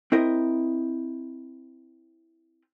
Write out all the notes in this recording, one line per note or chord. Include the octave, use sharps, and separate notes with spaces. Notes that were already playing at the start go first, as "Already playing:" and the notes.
C4 E4 A#4 D#5